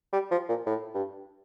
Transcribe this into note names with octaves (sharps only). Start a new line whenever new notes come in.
G3
F3
A#2
A2
G2